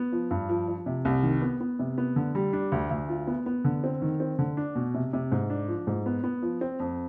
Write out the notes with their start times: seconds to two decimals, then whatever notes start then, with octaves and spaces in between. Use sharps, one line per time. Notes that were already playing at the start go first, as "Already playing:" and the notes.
Already playing: B3
0.12 F3
0.31 G2
0.49 F3
0.68 F3
0.86 C3
1.05 C2
1.23 D#3
1.42 B3
1.60 B3
1.79 C3
1.98 B3
2.16 D3
2.35 G3
2.53 D4
2.72 D2
2.90 D2
3.09 F4
3.27 B3
3.46 B3
3.64 D3
3.84 C4
4.02 D#3
4.20 C4
4.39 D3
4.57 D4
4.75 B2
4.94 C3
5.13 C3
5.32 G#2
5.50 D4
5.68 F3
5.87 G#2
6.06 B3
6.24 B3
6.42 F3
6.61 C4
6.80 F2